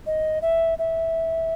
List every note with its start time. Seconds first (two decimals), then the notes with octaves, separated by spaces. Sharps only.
0.06 D#5
0.42 E5
0.78 E5